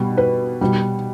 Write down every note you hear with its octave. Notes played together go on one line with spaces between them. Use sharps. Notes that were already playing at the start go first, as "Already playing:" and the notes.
Already playing: B2 G3
B4
B2 G3